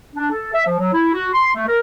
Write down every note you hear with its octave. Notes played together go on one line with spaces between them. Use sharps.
D4
A4
E5
F3
F#3
E4
F#4
C6
A3
A#4